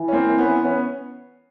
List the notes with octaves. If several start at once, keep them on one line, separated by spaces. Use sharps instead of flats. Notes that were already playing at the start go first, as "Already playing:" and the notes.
Already playing: E3
C#4
A#3 C4
B3 C#4
B3 C#4